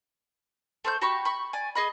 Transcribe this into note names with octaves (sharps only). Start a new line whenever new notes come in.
A3 C5 G6
F#4 G4 B5 C#6
B5 C#6
D5 G#5
G#4 D#5 B5